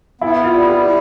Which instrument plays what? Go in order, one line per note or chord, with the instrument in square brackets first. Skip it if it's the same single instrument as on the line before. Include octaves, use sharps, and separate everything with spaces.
[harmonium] B3 [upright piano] E4
[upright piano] F4
[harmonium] G3
[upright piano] G4
[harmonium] E4